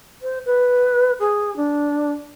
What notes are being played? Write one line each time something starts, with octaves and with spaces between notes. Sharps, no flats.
C5
B4
G#4
D4